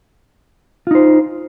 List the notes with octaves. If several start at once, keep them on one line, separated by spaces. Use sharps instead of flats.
D#4 F4 C5